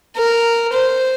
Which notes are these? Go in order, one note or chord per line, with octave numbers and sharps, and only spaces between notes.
A#4
C5